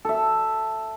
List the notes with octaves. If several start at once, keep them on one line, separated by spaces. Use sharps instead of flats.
A4 E5